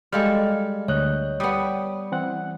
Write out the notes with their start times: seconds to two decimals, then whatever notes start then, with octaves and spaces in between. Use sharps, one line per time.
0.12 G3 G#3 A4 F5 F6
0.88 D2 C#5 D#5 F#6
1.40 G3 B3 D#6
2.12 E3 C4 F#5